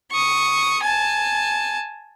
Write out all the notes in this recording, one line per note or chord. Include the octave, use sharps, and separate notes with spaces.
C#6 D#6
G#5 A5